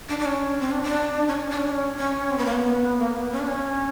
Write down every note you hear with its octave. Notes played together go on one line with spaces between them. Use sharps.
D4
D4
C#4
C4
D4
D4
C#4
D4
C#4
D4
C#4
D4
C#4
C#4
C4
B3
A#3
B3
A#3
B3
C#4
D4
C#4